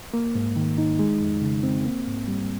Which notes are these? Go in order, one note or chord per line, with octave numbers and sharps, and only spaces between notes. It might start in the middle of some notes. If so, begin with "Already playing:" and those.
A#3
G#2
D#3
D#4
G#3
F2
C#3
C4
A#3
G#2
G3